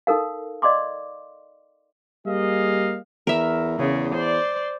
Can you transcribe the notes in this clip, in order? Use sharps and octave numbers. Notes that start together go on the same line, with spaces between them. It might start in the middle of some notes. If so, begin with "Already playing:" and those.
D#4 A4 A#4 F5
D5 D#5 F5 C6 D6
G3 A#3 G#4 D#5 F5
E2 A#4 E5
E2 C#3
C5 D5